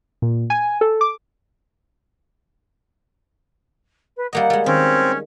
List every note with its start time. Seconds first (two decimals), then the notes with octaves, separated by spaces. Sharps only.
0.22 A#2
0.50 G#5
0.81 A4
1.01 D6
4.17 B4
4.33 G3 A#3 D#5 F#5
4.50 G3 G#3
4.66 D#3 C4 C#4